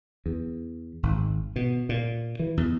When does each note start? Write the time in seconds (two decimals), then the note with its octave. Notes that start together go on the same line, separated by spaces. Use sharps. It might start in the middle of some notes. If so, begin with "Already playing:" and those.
0.26 E2
1.03 G#1
1.56 B2
1.89 A#2
2.39 E3
2.57 E2